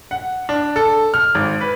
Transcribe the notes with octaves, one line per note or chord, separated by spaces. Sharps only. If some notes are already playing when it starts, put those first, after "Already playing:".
F#5
D4
A4
F6
G#1
B4